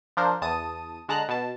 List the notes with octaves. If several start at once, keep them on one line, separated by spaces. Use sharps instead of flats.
F3 D4 A#4 C5
E2 A5 D#6 D#7
D3 G#3 A5 A#5 F#6
B2 A5